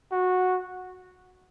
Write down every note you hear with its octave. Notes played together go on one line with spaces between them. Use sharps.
F#4